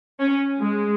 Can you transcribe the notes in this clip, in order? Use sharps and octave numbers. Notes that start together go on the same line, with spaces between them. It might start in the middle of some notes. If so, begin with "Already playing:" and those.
C#4
G#3